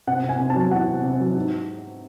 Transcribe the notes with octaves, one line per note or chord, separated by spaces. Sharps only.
C3 F#5
C3
G#5
C3
A5
F#3
E2 F#5
C3
C3
F#3
G#2